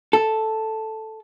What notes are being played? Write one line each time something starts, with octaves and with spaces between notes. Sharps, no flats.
A4